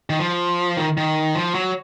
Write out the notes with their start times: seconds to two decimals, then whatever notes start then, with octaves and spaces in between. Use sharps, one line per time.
0.10 D#3
0.19 F3
0.77 D#3
0.97 D#3
1.35 F3
1.55 F#3